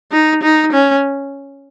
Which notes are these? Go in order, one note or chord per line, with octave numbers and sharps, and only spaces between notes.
D#4
D#4
C#4